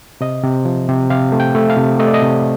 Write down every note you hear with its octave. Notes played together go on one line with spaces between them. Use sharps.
C3 D#5
C3
F3
C3
C3 F5
A3
G5
A3
F5
C3
A3 D#5
D5
D#5
C3